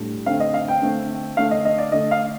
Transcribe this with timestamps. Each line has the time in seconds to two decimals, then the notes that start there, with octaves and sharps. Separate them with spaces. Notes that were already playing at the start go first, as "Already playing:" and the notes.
Already playing: A2 G3 D4
0.26 D3 A3 C4 F5
0.40 D#5
0.54 F5
0.68 G5
0.82 D3 A3 C4
1.37 D3 A3 D4 F5
1.51 D#5
1.65 D#5
1.79 D5
1.92 D3 A3 D4 D#5
2.11 F5